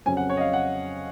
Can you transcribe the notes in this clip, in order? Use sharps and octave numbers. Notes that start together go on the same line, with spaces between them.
F2 C#3 F#3 C#4 G#5
F#5
C#5
D#5
F5
F#5